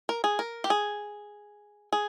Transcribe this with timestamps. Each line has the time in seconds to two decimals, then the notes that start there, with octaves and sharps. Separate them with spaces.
0.09 A#4
0.24 G#4
0.39 A#4
0.64 G4
0.70 G#4
1.93 G#4